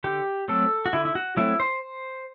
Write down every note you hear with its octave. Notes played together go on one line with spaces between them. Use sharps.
D3 G4
F#3 A3 C4 A4
F#4
D3 E4
E4
F#4
F#3 A3 C4 E4
C5